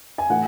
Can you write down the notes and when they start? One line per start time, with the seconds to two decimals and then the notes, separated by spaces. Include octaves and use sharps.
0.18 G#5
0.29 A2 E3 A3 F#5